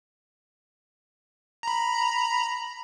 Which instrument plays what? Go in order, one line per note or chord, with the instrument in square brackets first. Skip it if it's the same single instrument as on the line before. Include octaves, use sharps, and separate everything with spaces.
[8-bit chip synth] A#5 B5